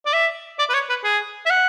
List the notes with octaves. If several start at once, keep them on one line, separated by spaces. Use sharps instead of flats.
D5
E5
D5
B4
C#5
B4
G#4
E5
F#5